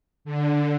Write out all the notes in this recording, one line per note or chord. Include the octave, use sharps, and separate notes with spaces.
D3